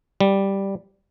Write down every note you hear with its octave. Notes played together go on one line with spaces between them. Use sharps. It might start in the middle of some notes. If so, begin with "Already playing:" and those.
G3